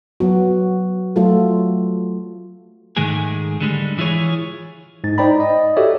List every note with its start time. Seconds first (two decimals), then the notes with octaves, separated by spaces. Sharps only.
0.20 F#3 B3 F#4
1.16 F#3 A3 F4 F#4 A4
2.97 G#2 D#3 G#3 A3 G#4
3.61 D3 G3 G#3
3.98 E3 E4 F4 G#4 C#5
5.04 G#2 A6
5.18 D#4 C5 D5 G5 A#5 B5
5.40 D#5
5.77 F#4 G4 A4 C#5 D5 E5